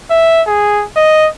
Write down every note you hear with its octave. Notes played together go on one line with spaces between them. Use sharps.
E5
G#4
D#5